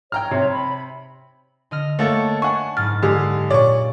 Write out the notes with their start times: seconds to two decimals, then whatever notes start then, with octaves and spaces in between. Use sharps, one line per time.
0.12 C#5 G5 A#5 F6
0.31 C3
0.50 B5
1.71 D3 D#5 F6
1.99 A3 A#3 A4 C#5 F#5 A5
2.42 D4 F#5 G#5 C#6
2.77 F#1 G#2 F6 A6
3.03 D3 G#3 G4 G#4
3.50 A#2 C#5 D5 C#6